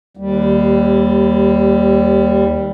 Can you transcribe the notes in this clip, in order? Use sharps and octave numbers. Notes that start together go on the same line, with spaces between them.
D#2 G3